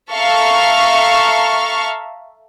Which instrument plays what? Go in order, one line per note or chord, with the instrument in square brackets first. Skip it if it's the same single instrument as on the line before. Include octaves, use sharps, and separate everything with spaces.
[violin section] A4 E5 F5 A#5 C#6 F6